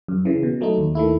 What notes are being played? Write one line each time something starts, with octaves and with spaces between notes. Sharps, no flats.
F#2
C#3 E3
B2
F#3 A3 D#4
D#2
D#3 A3 E4